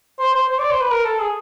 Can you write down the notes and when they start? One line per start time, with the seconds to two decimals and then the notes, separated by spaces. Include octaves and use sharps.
0.20 C5
0.34 C5
0.49 C5
0.59 D5
0.71 C5
0.81 B4
0.91 A#4
1.06 A4
1.20 G#4